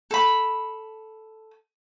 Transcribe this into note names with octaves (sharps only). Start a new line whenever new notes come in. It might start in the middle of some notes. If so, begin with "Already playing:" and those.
A4 B5